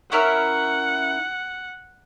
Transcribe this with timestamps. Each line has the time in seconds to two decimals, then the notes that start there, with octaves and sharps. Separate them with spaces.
0.11 C#4 E4 A#4 E5 F#5